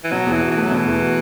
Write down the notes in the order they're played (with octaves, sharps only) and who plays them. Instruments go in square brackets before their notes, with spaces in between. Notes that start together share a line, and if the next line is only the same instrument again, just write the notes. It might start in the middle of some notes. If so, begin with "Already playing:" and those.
[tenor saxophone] E3
[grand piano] B2 [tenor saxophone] F#3
[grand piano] E2
[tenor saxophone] E3
[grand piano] F#4
[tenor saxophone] E3 [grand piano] A3
[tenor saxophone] F#3
[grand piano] B2 [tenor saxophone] E3
[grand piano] E2
F#4